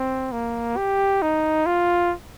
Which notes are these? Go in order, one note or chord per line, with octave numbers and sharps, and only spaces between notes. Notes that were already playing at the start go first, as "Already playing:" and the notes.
Already playing: C4
A#3
G4
D#4
F4